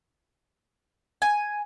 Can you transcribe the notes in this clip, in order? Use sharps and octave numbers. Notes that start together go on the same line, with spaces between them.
G#5